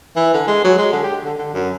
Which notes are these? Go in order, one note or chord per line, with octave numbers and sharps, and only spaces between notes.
E3
D3
G#3
F#3
G#3
D3
G4
D3
D3
F#2